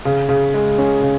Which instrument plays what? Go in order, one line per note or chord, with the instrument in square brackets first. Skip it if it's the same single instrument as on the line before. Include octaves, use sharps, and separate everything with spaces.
[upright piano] C#3
C#3
G#3
C#4
C#3